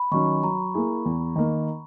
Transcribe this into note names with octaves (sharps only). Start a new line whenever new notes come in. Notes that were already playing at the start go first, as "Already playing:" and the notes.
Already playing: B5
D#3 F#3 C#4 C#6
F#3 A#5
A#3 E4 G#4
E2
D#3 A#3